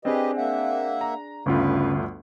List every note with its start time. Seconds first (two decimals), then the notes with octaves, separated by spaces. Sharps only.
0.05 C4 D4 G4 G#4 B4 D#5
0.37 A#3 E5 F#5
1.01 A#5
1.46 G1 D2 C#3 F4 B4